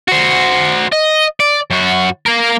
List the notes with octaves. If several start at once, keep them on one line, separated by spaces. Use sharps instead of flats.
F#4 C5
D#5
D5
F#2 F#4
A#3 A#4